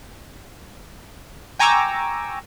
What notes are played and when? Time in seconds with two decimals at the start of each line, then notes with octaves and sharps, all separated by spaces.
1.59 G5 G#5 A#5 C#6 D6 E6